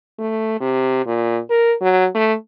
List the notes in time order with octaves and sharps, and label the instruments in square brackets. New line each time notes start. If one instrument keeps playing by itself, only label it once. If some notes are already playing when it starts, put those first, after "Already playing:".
[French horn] A3
C3
A#2
A#4
F#3
A3